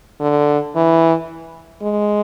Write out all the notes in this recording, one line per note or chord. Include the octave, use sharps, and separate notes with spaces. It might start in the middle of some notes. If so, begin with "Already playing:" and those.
D3
E3
G#3